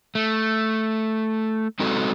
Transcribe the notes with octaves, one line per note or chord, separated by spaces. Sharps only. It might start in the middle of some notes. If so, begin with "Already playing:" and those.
A3
G#3 C4 D#4 F#4 A4